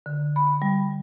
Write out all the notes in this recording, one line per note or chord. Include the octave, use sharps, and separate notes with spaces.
D3
B5
G3